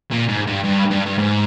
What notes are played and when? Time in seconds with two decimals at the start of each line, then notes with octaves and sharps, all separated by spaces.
0.12 A#2
0.29 G#2
0.47 G2
0.64 G2
0.91 G2
1.06 G2
1.18 G#2